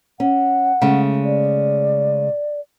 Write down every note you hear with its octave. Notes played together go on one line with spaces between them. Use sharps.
C#4 F#5
C#3 G#3 A3
D5